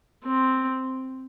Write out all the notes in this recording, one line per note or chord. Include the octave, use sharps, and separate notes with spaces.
C4